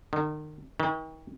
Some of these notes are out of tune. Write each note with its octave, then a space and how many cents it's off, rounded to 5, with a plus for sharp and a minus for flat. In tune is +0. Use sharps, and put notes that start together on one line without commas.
D#3 -35
D#3 +40